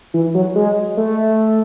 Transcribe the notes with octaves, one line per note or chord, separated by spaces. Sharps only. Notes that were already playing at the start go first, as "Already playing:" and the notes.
E3
F#3
G#3
A3